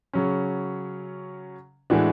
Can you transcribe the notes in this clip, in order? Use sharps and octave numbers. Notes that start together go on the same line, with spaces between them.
C#3 F#3 C#4
A2 E3 G#3 D4 F#4